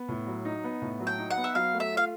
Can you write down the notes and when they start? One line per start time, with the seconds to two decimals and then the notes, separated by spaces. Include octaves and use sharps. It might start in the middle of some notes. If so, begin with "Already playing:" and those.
Already playing: B3
0.08 A2
0.27 F#3
0.45 D#4
0.64 B3
0.82 A2
1.00 F#3
1.07 G5
1.18 D#4
1.30 F#5
1.37 B3
1.44 E5
1.55 F#3 F5
1.74 A3
1.80 E5
1.92 F4
1.97 F5